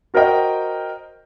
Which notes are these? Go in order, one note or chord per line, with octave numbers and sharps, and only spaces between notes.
F#4 A#4 C5 D#5 G5